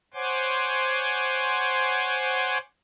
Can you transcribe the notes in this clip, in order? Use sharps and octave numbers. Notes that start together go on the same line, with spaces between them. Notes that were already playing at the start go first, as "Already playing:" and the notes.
C5 C#5 F#5 G#5 C6 D6